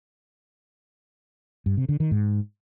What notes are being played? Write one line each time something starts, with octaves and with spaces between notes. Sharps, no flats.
G2
C3
D3
D#3
G#2